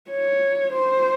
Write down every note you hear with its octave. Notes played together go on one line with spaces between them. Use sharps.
C#5
C5